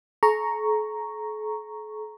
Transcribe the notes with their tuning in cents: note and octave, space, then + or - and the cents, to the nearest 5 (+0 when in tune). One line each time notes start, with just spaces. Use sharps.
A4 -45 A#5 +0 C#6 +0